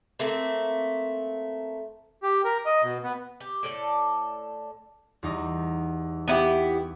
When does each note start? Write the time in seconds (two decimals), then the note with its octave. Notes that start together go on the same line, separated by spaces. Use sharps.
0.19 A3 A#3 C4
2.23 G4
2.44 A#4
2.66 D#5
2.82 B2
3.04 B3
3.40 G4
3.63 A2 A4 D5
5.23 E2 G3 D#4
6.28 B3 E4 G4